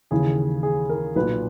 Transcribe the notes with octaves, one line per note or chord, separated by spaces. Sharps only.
D#2 C#3 E3 G#4
G#4
A#4
B1 A#2 B4